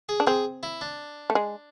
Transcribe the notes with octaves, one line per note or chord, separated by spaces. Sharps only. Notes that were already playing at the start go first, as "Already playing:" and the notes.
G#4
D4
C4 G#4
E4
D4
A3
G#3